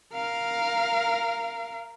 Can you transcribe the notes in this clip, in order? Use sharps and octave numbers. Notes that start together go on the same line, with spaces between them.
A#4 F5